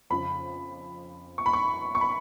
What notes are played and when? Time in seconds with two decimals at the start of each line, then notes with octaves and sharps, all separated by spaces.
0.10 F2 C#3 F3 B5
1.38 C#6
1.46 B5
1.53 C#6
1.95 C#6
2.01 B5